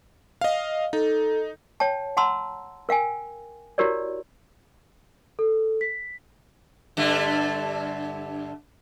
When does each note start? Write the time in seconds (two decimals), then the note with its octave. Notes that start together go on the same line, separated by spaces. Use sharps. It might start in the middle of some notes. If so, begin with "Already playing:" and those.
0.41 D#5 F5
0.93 D#4 A4
1.80 C#5 G5 A5
2.17 F#5 A5 A#5 C6 E6
2.89 A#4 F5 G5 G#5
3.78 E4 F#4 G4 A#4 C#5 D5
5.39 A4
5.81 B6
6.97 G2 D3 A3